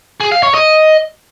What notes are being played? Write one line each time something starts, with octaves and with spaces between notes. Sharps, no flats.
G#4
F5
C#5
D#5